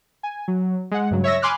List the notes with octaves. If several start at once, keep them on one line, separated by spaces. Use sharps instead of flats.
G#5
F#3
G#3 F#5
G2 C#3 F#3
C#5 E5 C#6 E6 A#6
G#5 B5 C6 D6 F6 F#6